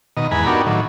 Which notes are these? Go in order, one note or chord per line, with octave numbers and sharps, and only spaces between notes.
B2 D#3 D#5
E2 G#2 B4 G#5 A#5 B5
B3 D4 D#4 F#4 G4 A#4
A2 D#3 F#3